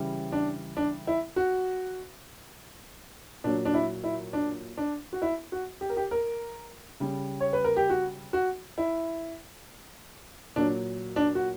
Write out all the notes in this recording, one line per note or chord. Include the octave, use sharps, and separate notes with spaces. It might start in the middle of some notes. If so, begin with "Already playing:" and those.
Already playing: C#3 E3 G3
D4
D4
E4
F#4
A#2 F#3 D4
D4
E4
E4
D4
D4
F#4
E4
F#4
G4
A#4
G4
A#4
C#3 G3
C#5
B4
A#4
G4
F#4
F#4
E4
A#2 F#3 D4
D4
F#4